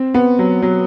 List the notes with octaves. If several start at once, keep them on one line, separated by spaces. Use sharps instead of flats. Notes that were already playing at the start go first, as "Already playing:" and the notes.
Already playing: C4
B3
F#3
F#3